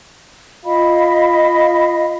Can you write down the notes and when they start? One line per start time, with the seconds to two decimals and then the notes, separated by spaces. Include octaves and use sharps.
0.65 F4 D#5 F5 B5